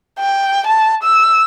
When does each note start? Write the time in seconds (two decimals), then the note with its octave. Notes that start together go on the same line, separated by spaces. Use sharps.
0.19 G5
0.67 A5
1.03 E6